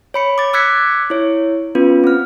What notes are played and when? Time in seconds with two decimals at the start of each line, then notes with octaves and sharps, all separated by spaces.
0.14 C#5 B5 C#7
0.38 D6 A6
0.53 D6 E6 F#6 G#6 B6 C#7
1.10 E4 C#5
1.75 B3 C#4 F4 B4
2.04 C4 F6